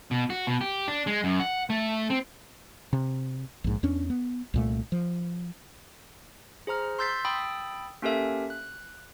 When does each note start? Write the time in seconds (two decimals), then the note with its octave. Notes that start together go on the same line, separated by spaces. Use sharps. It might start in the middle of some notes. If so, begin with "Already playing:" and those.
0.11 B2
0.30 F#4
0.47 B2
0.61 G4
0.88 D4
1.07 G#3
1.24 F#2
1.40 F#5
1.70 A3
2.10 C4
2.93 C3
3.64 A#1 G#2
3.83 E2 C#4 D4
4.10 B3
4.54 C2 A#2 A3
4.92 F3
6.67 G#4 C5 A#5 F6
6.99 C6 E6 G6 A6 B6 C7
7.25 G5 B5 D#6 E6 A6
8.02 A#3 C#4 G4 A4 A#4 E5
8.50 F#6